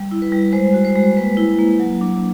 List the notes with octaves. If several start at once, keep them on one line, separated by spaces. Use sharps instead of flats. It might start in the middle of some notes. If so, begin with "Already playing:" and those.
Already playing: G3
E4
B4
G3
G#3 C5
F#4
C5
G#3
A#3 B4
E4
A#3
F#3
D4